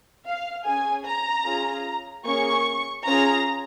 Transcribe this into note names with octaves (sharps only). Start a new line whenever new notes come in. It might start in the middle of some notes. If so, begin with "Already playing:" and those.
F5
C#4 G#4 G#5
A#5
C#4 F4 G#4
A#3 C#4 G#4 C#6
C#4 F4 G#4 A#5